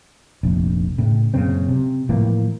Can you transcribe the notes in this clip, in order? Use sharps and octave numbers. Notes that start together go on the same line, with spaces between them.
F1 A#1
A2 C#3
F#2 A#2 C#3 C4
C3
A2 E3 F3 A#3